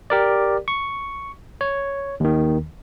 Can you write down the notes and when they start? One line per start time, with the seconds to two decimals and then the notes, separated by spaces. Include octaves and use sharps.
0.10 G4 A#4 D5
0.68 C#6
1.61 C#5
2.20 D#2 D#3